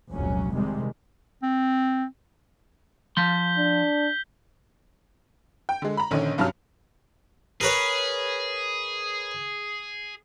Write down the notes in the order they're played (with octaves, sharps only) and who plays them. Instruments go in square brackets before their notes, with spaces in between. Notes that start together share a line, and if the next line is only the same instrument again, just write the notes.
[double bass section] F1 C#2 A#2 F#3 C#4
C3 D#3 G3 G#3
[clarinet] C4
[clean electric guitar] F3 C6 [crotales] G6 B6 G7
[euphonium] D4
[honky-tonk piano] G5
D3 G#3
A#5 B5
A#1 D3 D#3 C#4 D#7
C2 G2 F#3 C#4 A5 F6
[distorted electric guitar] G#4 [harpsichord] A#4 B4 C#5